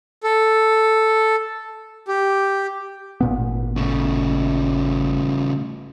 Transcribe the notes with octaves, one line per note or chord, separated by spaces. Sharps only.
A4
G4
G#1 A#2 B3
C#3 A3